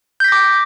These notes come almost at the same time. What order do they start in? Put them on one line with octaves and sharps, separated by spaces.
G6 B6 A#6 D6